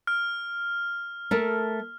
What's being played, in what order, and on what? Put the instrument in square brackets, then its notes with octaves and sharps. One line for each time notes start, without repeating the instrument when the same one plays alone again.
[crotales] F6
[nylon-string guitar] A3 A#4 A5